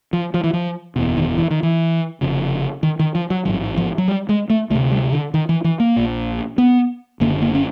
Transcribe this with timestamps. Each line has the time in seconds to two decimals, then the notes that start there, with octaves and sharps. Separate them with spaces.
0.13 F3
0.34 F3
0.44 E3
0.53 F3
0.96 F#1 E2 B2
1.17 D#3
1.38 E3
1.51 D#3
1.63 E3
2.21 F1 F2 C#3
2.83 D#3
2.99 D#3
3.15 F3
3.30 F#3
3.45 A1 G#2 F#3
3.77 F3
3.98 F#3
4.08 G3
4.29 G#3
4.50 A3
4.70 D2 A3
4.75 C3
4.91 G3
5.12 D3
5.34 D#3
5.49 E3
5.64 E3
5.80 A#3
5.96 A#1 A#2
6.58 B3
7.20 F#1 F#2 D3 A#3
7.42 A#3
7.55 C#4